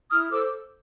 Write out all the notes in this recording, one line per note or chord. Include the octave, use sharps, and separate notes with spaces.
E4 D#6 F6
A4 C5 D6 E6